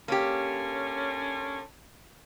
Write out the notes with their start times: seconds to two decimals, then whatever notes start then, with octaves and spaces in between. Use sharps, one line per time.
0.08 D3 A#3 C#4 G4